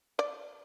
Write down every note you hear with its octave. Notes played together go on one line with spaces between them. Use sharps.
D5